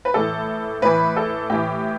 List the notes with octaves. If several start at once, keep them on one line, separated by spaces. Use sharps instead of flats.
B4
A2 E3 A4
A2 E3 B4
A4
A2 E3 G4